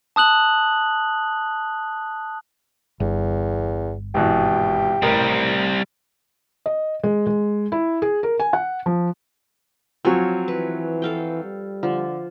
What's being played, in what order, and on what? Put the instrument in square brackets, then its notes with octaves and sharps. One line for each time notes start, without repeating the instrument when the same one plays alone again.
[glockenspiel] A5 D#6 F#6 F#7
[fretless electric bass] G1 [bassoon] E2
[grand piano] G#1 B2 E3 [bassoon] G4
[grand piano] A1 A#4 [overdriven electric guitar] G3 C4
[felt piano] D#5
G#3
G#3
E4
G#4
A#4
G#5
F#5
F3
[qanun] F3 C#5 G#5 [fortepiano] F#3 C4
[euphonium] E3 [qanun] B4
[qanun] A4 F5 G5
[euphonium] G3
[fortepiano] D3 [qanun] F3